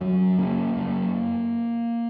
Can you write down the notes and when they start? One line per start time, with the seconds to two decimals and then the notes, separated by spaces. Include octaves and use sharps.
0.01 F#2 F#3
0.39 C#3 A#3
0.76 F#2 A#3